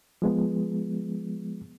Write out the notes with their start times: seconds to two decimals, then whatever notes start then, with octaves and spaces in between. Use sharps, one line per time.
0.22 F3 G#3 B3